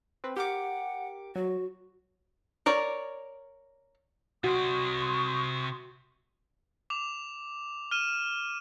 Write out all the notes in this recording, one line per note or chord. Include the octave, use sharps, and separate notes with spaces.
C4 B4
G4 A#4 F#5 D6
F#3 F#4
A#4 C#5 D5
C3 F#4 D5 C6 C#6 D#6
D6 F7
F6 D#7 E7